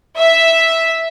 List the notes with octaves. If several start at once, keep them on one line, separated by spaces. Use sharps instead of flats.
E5